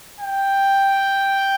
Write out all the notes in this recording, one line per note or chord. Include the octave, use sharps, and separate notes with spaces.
G5